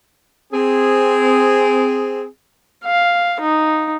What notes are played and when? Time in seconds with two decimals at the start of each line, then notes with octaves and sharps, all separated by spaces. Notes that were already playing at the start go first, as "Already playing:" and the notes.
0.53 C4 G#4
2.85 F5
3.40 D#4